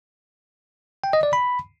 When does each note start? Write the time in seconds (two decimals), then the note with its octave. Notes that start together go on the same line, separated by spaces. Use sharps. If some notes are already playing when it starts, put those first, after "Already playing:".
1.04 G5
1.13 D#5
1.23 D5
1.33 B5